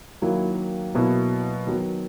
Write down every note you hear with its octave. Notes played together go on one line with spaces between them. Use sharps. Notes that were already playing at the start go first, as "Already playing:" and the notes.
D#3 F#3 A#3 E4
B2 F#3 A#3 E4
D#3 F#3 B3